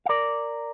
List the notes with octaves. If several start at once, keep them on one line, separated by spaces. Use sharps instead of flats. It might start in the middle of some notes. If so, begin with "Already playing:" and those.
F5
A#4 D5